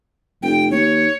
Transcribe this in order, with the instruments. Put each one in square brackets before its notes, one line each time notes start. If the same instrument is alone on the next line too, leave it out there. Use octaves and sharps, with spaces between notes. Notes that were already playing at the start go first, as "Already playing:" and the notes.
[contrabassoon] F1 [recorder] G5
[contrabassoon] D#2 [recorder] C#5